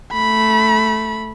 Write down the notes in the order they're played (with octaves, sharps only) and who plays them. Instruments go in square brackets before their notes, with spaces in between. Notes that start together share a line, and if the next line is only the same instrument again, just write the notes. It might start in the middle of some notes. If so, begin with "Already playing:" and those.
[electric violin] A3 B5